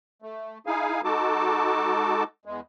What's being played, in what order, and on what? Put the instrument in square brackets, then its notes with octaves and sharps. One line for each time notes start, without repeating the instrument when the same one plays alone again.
[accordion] A3
D#4 E4 G#4 F5 G#5
G#3 D#4 F#4 A4 A5 D6
E2 G#3